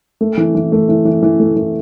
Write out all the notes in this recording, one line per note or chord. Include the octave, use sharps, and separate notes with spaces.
A3
E3
E3
A3
E3
E3
E3
A3
E3